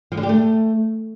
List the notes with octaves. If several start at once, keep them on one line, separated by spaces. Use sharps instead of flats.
F3
D3
G4
A3